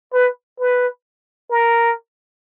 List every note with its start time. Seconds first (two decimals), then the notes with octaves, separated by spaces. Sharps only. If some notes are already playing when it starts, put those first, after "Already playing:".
0.14 B4
0.60 B4
1.51 A#4